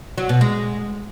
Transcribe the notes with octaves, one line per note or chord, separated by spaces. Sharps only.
F#3
B2
G#3